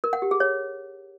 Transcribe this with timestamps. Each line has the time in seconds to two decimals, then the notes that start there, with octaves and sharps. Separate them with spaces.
0.04 A#4
0.13 F#5
0.22 G4
0.31 G#4
0.40 C#5